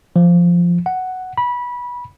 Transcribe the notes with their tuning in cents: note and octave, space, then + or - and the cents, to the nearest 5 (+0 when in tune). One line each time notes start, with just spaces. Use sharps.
F3 -5
F#5 +5
B5 -20